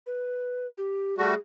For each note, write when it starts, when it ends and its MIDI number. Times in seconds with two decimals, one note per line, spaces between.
0.07 0.67 71
0.78 1.15 67
1.18 1.34 55
1.18 1.34 57
1.18 1.34 66
1.18 1.38 68